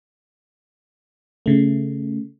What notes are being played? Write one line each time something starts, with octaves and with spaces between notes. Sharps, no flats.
C#3 A3